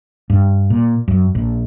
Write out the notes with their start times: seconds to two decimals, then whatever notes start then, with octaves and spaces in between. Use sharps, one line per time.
0.30 G2
0.70 A#2
1.08 F#2
1.35 A#1